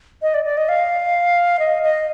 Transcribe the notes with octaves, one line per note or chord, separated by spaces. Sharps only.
D#5
D5
D5
D#5
F5
D#5
D#5